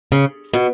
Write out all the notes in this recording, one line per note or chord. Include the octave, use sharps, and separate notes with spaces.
C#3
B2